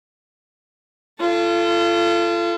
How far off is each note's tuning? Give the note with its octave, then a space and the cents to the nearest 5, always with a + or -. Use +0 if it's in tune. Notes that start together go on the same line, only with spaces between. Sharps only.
F4 -35 A4 +0